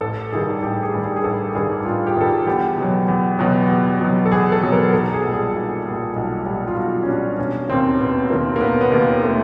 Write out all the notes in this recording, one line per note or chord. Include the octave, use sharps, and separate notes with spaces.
A1 A4
G2 D#3 G3 G#4
A1 G4
G#4
G2 D#3 G3
G#4
G#4
A1 A4
G2 D#3 G3 G#4
A1 F4
G4
G2 D#3 G3 A4
G#4
E2 G4
B2 F#3
E2
B2 F#3
E2
B2 F#3
A4
E2 G#4
A4
B2 F#3
A#4
B1 A4
G#4
A#2 G3
G#4
B1
A#2 G3
B1
A#2 G3
F4
B1 F#4
C#4
A#2 G3 D4
E1 C#4
D#2 D#3 C4
E1 B3
D#2 D#3 A#3
A#3
E1 B3
B3
D#2 D#3 A#3
A3